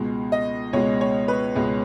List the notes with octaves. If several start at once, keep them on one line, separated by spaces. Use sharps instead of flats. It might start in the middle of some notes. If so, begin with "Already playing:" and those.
Already playing: C#2 B2 G#3
D#5
C#2 B2 G#3 C#5
C#5
B4
C#2 B2 G#3